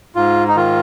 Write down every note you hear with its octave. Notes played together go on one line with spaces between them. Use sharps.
G#2 F4
D#4
D#3 F4